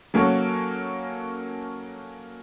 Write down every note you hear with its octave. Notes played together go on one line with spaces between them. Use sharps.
F#3 A#3 C#4 A4 C#5 F#5